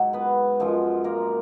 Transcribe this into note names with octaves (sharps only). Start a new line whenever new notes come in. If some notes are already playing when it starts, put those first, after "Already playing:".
Already playing: G#2 F#3 F#4
B3 B4
F#2 F3 G#3
A#3 A#4